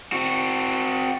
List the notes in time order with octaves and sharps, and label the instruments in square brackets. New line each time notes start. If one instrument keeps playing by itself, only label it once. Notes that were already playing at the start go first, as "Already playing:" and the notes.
[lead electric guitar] C4 F#4